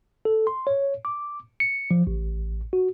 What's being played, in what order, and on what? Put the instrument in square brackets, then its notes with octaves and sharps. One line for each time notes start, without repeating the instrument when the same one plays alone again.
[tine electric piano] A4
C6
C#5
D6
C#7
F3
A1
F#4